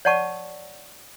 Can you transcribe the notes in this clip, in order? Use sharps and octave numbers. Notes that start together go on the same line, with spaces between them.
C#5 D5 F#5 A5 C#6